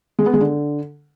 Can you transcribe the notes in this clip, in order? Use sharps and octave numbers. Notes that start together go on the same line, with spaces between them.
G#3
B3
G#3
D3